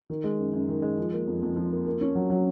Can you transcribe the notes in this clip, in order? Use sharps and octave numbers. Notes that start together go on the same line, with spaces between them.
D#3
G#3
F#2
F#2
D#3
G#3
F3
A#3
F2
F2
F3
A#3
A#3
C#4
F#3
F#3